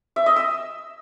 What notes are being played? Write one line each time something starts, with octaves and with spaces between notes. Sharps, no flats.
E5
D#5
E6